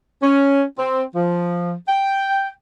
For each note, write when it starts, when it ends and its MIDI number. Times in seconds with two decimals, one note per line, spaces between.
0.22 0.62 61
0.78 1.03 60
1.15 1.73 53
1.88 2.48 79